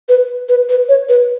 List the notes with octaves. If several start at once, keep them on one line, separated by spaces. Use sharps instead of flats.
B4
B4
B4
C#5
B4